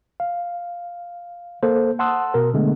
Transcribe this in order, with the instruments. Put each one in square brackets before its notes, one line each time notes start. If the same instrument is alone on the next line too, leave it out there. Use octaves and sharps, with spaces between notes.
[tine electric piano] F5
A#3 A4 C5
F#5 A5 C6 D#6 E6 F#6
B2 A#4
D3 G#3 A3 B3